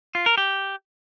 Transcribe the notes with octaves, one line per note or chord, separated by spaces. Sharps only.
F4
A#4
G4